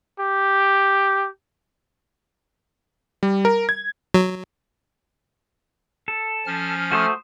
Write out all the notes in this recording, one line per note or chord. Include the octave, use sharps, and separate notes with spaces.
G4
G3
A#4
G#6
F#3
A4
F3 C#4 F6
A3 F#4 C5 D#6